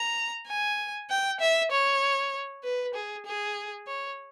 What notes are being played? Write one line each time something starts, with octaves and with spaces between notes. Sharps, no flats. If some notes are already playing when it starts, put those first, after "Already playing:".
Already playing: A#5
G#5
G5
E5
C#5
B4
G#4
G#4
C#5